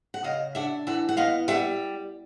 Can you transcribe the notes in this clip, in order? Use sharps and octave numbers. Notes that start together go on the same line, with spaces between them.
F#5
C#3 D#5 F5
D4 E5 F#5
E3 E5 F#5
F#5
B3 D#5 F5
G3 E5 F#5